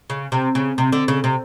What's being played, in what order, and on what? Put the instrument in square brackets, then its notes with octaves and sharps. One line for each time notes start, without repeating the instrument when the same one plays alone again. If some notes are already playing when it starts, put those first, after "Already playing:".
[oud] C#3
C3
C#3
C3
D3
C#3
C3